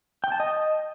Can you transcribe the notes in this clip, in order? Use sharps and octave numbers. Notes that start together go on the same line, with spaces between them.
G5
A5
D#5